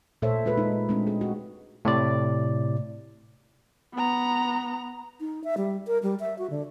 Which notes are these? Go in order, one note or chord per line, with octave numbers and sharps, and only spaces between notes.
A#2 A3 A4 C5 C#5 E5
G#3 F4 G#4 B4
G#3 D#4
G#3 A3 C4 D4
C4 G#4
F#4
A2 C3 D5
B3 A#5
D#4
E5
G3
A#4
G3
E5
F#4
D3